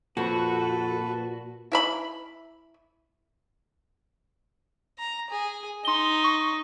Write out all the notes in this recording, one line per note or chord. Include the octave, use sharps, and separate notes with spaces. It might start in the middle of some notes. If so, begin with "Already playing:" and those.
F2 A#2 F#4 A4 B4
E4 E5 B5
A#5
G#4
D#4 C6 G7
C#6